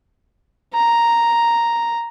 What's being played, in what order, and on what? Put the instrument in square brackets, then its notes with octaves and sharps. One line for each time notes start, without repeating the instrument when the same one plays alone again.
[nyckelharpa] A#5